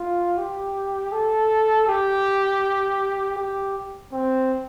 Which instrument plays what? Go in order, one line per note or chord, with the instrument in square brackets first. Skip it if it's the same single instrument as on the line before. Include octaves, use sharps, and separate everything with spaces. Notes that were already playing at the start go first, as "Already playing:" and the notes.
Already playing: [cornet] F4
G4
A4
G4
G4
C4